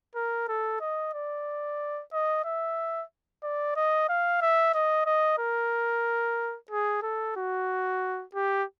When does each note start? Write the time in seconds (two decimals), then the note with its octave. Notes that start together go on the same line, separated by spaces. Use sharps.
0.16 A#4
0.49 A4
0.81 D#5
1.14 D5
2.13 D#5
2.44 E5
3.43 D5
3.76 D#5
4.09 F5
4.42 E5
4.74 D#5
5.06 D#5
5.39 A#4
6.71 G#4
7.03 A4
7.37 F#4
8.35 G4